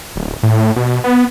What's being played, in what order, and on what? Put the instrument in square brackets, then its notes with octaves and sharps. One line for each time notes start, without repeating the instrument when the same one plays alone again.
[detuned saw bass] D1
A2
B2
B3